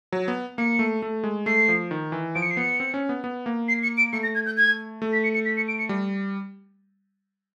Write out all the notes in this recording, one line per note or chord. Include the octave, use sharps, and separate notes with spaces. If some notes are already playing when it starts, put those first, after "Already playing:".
F#3
B3
A#3 C#7
A3
A3
G#3
A3 C7
F3
D#3
E3
F3 D7
C#7
C7
B3 C#7
C4
C#4
B3
B3
A#3
C7
C#7
D7
A3 C#7
A#6
G#6
G6
G#6
A3
B6
C#7
C#7
B6
C#7
D7
C#7
G3